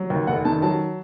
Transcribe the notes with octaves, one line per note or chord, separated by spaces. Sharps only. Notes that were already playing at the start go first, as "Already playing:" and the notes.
Already playing: F#3
D#2
F1 F#5
D#3 A5
F#3 A5